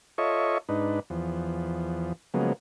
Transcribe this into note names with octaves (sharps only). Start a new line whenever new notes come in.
F4 A4 C#5 D#5 E5 C#6
G#2 D4 D#4 B4
E2 F3
C#3 F3 F#3 G#3 A#3 B3